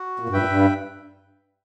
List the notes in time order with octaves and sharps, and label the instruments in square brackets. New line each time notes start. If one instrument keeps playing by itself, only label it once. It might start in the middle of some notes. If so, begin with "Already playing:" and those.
Already playing: [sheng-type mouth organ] F#4
[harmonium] A#2
G2
[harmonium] A#2 [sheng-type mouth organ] B4 E5 G5
[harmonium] G2